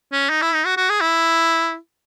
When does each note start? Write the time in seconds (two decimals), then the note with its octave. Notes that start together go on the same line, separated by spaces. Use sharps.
0.12 C#4
0.30 D#4
0.42 E4
0.54 D#4
0.66 F#4
0.77 F#4
0.89 G#4
1.01 E4